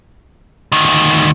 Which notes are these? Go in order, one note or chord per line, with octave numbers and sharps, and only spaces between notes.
D2 D#3